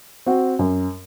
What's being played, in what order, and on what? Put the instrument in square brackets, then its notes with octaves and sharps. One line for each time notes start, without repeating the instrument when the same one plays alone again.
[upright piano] C4 F#4
F#2